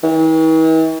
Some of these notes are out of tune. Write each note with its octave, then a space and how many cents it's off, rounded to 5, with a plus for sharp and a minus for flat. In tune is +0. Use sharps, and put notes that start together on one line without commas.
E3 -45